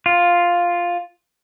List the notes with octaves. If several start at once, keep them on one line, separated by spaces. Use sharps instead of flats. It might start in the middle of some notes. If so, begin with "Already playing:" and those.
F4